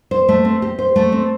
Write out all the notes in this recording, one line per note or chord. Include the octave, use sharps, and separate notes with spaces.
C5
A3
C4
G4
C5
A3
C4